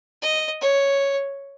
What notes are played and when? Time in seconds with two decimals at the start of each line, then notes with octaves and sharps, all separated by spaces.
0.22 D#5
0.61 C#5